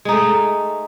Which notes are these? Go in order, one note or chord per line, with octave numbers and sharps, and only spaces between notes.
G#3 A3 D#4